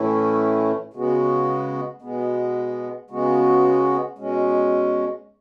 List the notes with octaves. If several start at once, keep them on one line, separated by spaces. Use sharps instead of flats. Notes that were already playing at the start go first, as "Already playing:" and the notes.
Already playing: A2 E3 A3 C#4 E4
C#3 G#3 B3 F#4
B2 G#3 B3
C#3 G#3 B3 F#4
B2 G#3 C#4